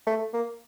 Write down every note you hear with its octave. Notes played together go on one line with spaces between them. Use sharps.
A3
A#3